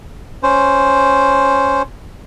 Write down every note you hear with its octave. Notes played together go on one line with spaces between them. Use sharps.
C#4 C5